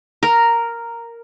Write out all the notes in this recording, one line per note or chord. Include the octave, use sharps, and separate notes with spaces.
A#4